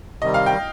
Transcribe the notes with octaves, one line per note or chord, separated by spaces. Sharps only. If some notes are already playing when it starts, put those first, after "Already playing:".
C3 D#3 G3 D#5
F5
G5